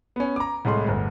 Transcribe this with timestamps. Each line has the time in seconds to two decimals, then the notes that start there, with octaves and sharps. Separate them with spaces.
0.16 B3 C#4
0.36 A#5 D6
0.65 C2 A2 G#3 C6
0.86 G1 D2